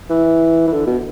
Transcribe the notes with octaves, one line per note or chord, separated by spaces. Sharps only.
E3
E3
D3
B2